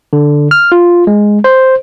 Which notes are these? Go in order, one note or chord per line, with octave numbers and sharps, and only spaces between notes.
D3
F6
F4
G#3
C5